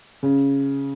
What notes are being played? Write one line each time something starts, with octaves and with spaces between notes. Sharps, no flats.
C#3